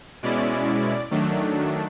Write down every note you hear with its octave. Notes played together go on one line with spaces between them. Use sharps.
B2 G#3 C#4 E4 D5
D#3 F#3 A3 D4